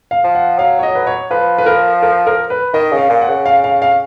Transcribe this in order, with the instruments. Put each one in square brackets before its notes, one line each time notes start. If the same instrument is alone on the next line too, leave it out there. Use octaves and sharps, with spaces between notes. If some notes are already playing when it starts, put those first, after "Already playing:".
[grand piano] F5
[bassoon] F3
[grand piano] F#5
[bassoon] F#3 [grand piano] F5
[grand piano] C#5
D#5
B4
C#5
[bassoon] F3 [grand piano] B4
[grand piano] B4
A#4
A#4
A#4
B4
[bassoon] D#3 [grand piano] D#5
[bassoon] C#3
[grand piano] F5
[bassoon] A#2
[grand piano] F#5
[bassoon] C#3
[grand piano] F5
F5
F5